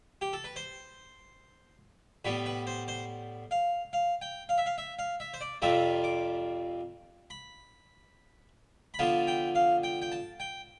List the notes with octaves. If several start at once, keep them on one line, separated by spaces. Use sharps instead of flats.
G4
A4
B4
C5
A2 G3 B3 B4
B4
C5
C5
F5
F5
G5
F5
E5
F5
E5
F5
E5
C5
D5
F2 C3 G3 C4 F4 E5
D6
B5
B5
D3 F3 B3 F4 A5
G5
F5
G5
G5
A5
G5